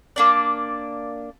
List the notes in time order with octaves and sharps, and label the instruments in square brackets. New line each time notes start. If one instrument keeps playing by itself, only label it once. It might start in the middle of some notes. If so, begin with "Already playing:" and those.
[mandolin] A#3 D4 D5